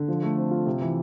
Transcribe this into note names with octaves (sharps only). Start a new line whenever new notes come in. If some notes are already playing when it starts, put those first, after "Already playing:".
Already playing: D3
F3
A3
C4
F4
C3
E3